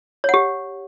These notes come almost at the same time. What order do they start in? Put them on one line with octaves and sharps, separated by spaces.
C#5 F#5 G4